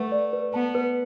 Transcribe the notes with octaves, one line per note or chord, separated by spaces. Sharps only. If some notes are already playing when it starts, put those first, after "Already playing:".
Already playing: A3 B4 F#5
D5
B4
B3 A5
B4